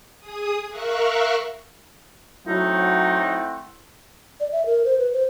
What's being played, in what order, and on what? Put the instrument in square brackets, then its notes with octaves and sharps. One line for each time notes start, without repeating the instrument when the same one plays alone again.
[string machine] G#4 D#6
A#4 E5 F5 C#6 F#6
[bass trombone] F#3 [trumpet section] A3 C4 F#5 [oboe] D#4 [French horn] E4
[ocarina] D5
E5
A#4
C5
B4
C5